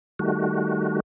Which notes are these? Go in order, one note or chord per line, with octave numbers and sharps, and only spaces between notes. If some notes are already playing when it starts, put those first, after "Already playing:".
D#3 G3 A3 F#4